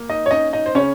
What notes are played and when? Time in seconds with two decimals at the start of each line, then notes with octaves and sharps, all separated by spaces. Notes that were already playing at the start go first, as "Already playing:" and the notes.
Already playing: A#3
0.09 D#4 D#5
0.26 C#5
0.31 C#4 D#4 D#5
0.53 D#4 D#5
0.66 C5
0.75 C#3 C#4 C#5